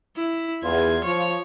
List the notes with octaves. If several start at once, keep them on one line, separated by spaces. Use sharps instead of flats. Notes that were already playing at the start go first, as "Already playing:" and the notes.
E4
E2 F4 G#6
F3 C#5